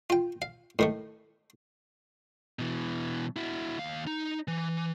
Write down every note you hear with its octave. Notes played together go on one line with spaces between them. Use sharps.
F4 G5
F5
A2 D#3 A3
B2 E3
E4 F#4
D#2 F5
D#4
E3